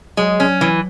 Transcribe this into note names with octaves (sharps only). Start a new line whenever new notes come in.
F#3 G#3
C#4
E3